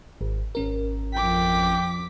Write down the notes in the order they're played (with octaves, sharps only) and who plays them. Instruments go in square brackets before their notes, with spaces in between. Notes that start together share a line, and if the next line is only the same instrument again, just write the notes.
[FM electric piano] G#1
G#1 C#4 A#4
[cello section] F2 [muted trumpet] G5 [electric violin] D6 B6